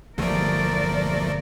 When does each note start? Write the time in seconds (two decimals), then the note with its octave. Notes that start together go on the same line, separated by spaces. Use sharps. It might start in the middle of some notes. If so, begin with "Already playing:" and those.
0.18 G1 E2 B2 F3 A3 A#4 D5